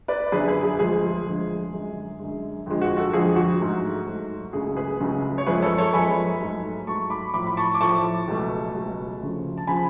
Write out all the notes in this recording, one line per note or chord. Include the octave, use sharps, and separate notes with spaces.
B4 D5
F#2 D3 F#3 B3 G#4 B4
G#4
G#4
D2 D3 F3 G#3 G#4
D2 D3 F3 G#3
F#2 D3 G#3
F#2 D3 G#3
F2 D3 F3 G#3
F#4
F#4 A4
F2 D3 F3 G#3 G#4
F#4
G#2 F#3 A3
G#2 F#3 A3
C#2 C#3 F#3 A3 G#4
G#4 B4
C#2 C#3 F#3 A3
C#5
F#2 F3 G#3 B3 G#4 B4
A4 C#5
A4 C#5
F#2 F3 G#3 B3 G#5 B5
G#2 F#3 A3
G#2 F#3 A3 A5 C#6
B5 D6
A2 F3 A3 B5 D6
B5
A5 C#6
D6
A2 F3 A3 A5 C#6
C#2 B2 F#3 A3
C#2 B2 F#3 A3
D2 C#3 F3
A5
C#3 F3 G#5 B5